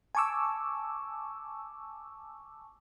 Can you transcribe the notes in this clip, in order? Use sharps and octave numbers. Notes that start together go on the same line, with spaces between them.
G#5 A5 C#6 D6 E6